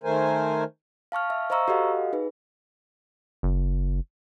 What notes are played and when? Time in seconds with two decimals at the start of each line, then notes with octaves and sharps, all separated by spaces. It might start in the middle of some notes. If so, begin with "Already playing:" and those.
0.04 D#3 A3 A#4 C5 G#5
1.12 F5 A5 C#6 F6
1.30 E5
1.50 C5 D#5 F5 A#5 C#6 E6
1.68 F#4 G4 A4 D#5 F5 F#5
2.13 D#4 G#4 B4
3.43 F#1